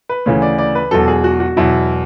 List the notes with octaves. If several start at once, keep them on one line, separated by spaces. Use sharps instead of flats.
B4
D2 C#3 E3 C#5
D5
D5
B4
E1 E2 B2 F#3 A4
G#4
F#4
F#4
E1 E2 B2 F#3 E4